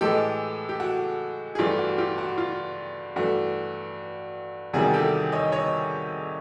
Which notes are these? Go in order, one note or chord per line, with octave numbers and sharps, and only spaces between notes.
A2 E3 G#3 G4 A4
G4
F#4
G#4
G2 E3 A3 F4 G4
F#4
F4 G4
F#4
F4
G2 E3 A3 F#4
E2 C3 D#3 G3 F#4 G#4
G4 A4
C#5 D#5
C#5 D#5